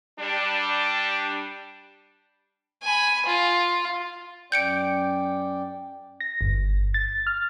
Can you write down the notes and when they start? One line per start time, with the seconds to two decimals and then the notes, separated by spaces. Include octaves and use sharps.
0.20 G3 D4
2.83 G#5 B5
3.26 F4
4.52 F#2 D5 G5 G6 C#7 D7
6.20 A#6
6.41 G1
6.94 A6
7.27 F6